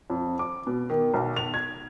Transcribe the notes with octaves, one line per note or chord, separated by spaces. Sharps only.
F2
D6
B2
D#3
B1
F7
G#6